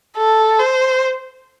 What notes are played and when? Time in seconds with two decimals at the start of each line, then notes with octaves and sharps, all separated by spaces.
0.17 A4
0.59 C5